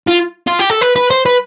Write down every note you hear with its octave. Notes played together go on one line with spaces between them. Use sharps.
F4
F4
G4
A4
B4
B4
C5
B4